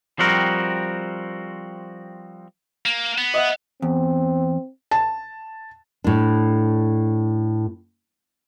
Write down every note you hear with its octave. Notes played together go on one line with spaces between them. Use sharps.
F3 G3 C4 F#4 A#4
A#3
B3
D#5 E5 F#5
E2 C4
A5
A2 D4